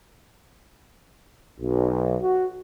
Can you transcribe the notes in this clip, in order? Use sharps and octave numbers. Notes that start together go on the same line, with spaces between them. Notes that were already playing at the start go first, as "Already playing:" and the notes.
B1
F#4